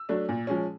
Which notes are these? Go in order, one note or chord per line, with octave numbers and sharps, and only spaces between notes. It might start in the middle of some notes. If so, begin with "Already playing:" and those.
Already playing: E6
F#3 A3 D4
A#2
F3 G#3 C#4